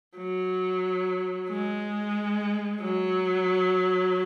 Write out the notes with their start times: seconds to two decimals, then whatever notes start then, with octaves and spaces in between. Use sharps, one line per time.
0.17 F#3
1.49 G#3
2.82 F#3